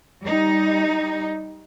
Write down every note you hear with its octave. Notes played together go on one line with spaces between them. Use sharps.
G3 D#4